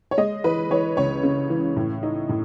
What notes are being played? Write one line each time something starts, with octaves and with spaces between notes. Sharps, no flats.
C#5
G#3 D#5
E3 B4
E3 C#5
C#2 C#5
C#3
E3
A2
D#4
A2